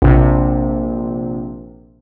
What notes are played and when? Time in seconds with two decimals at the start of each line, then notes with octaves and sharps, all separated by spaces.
0.02 A#1 C3